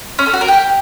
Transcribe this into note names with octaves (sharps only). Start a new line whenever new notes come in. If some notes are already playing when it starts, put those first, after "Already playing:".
C#4
A4
F#4
A#4
G4